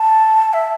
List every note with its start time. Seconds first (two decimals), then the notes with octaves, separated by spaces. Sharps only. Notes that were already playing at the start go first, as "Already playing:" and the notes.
Already playing: A5
0.53 E5